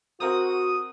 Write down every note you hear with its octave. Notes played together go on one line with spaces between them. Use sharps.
C4 F#4 A#4 F#5 D#6